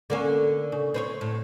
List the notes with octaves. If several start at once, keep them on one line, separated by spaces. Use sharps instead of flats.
D3 A#3 C#4
C#3
C4 B4 C#5
A2